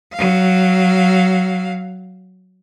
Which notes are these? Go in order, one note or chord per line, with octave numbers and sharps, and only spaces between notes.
F#3 F5